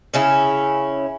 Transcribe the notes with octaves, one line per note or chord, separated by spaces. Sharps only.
C#3 C#4 E4